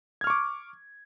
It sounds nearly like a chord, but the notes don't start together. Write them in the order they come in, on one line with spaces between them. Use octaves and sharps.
G#6 F6 C#6 D6